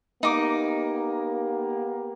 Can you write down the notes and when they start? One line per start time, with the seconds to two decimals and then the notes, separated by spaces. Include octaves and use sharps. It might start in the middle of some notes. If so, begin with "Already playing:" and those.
0.23 A#3 B3 D#4 G4 D6